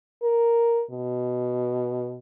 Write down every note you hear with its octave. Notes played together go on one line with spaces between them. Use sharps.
A#4
B2